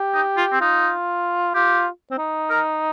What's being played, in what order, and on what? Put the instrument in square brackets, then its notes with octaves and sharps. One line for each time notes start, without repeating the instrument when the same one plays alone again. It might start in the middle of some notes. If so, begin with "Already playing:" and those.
Already playing: [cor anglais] G4
[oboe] D#4
F4
C4
[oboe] D#4 [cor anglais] F4
[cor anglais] F4 [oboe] G4
[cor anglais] C4
D#4
[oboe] A#4